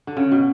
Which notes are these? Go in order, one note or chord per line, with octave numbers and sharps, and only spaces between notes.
D3
C#3
B2